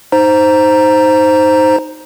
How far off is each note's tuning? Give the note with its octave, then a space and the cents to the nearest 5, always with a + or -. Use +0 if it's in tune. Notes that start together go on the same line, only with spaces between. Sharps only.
D#4 +0 C5 +0 A#5 +0